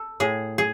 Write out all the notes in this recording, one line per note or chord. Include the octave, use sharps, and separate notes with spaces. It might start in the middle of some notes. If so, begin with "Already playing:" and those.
Already playing: A4
A2 G#4
G#4